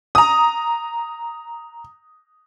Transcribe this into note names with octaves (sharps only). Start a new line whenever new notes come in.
A#5 D#6